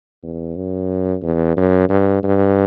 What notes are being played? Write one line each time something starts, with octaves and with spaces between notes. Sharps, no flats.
E2
F#2
E2
F#2
G2
G2